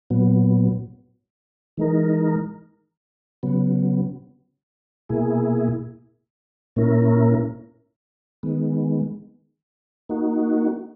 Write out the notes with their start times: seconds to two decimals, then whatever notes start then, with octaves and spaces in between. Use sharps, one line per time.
0.10 A#2 F#3 B3
1.77 E3 G#3 D#4 A#4
3.43 C#3 F#3 B3
5.09 B2 A#3 E4 G#4
6.76 A#2 A#3 C#4 E4 A#4
8.43 D#3 G#3 B3
10.09 A#3 D#4 F#4